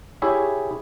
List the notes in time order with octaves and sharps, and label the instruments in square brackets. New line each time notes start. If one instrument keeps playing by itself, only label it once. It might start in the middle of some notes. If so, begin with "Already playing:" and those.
[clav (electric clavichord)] E4 G4 G#4 C#5 E5